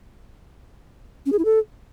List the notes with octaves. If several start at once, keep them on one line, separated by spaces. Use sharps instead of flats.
C#4
G#4
E4
A4